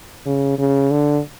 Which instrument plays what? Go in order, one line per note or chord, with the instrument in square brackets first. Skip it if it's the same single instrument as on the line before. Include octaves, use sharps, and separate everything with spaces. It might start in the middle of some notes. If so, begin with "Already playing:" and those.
[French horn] C#3
C#3
D3